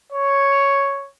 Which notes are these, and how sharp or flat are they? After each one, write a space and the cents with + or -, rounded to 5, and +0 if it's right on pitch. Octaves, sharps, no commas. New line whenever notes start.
C#5 +0